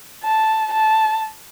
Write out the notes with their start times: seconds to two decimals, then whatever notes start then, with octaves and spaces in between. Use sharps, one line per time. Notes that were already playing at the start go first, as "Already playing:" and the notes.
0.23 A5
0.73 A5